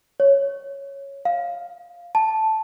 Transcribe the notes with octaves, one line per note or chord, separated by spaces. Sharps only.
C#5
F5
A5